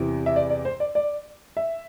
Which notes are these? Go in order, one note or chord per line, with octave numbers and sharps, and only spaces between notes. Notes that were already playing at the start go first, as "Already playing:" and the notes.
Already playing: E2 C3 E3
E5
D5
D5
C5
D5
D5
E5